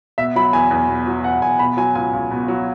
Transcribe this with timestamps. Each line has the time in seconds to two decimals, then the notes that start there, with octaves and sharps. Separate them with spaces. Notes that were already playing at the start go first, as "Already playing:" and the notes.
0.18 B2 E5
0.36 F#3 B5
0.53 E2 G#5
0.71 E2
0.89 B2
1.07 F#3
1.24 E2 F#5
1.42 E2 G#5
1.59 B2 B5
1.77 F#3 G#5
1.95 C#2 G#5
2.13 C#2
2.31 B2
2.48 F#3